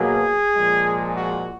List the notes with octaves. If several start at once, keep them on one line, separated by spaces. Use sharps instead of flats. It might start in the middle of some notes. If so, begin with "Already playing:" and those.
Already playing: B2 F#3 A#3 G#4
A#2 F3 G#3
F#4